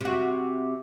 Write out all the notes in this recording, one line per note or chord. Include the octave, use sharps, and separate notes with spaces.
C3 F#4